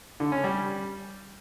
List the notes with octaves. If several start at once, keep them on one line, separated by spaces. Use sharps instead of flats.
D3
C#4
G3